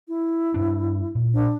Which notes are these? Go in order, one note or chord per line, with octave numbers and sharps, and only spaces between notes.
E4
G2 D4
A#2
D4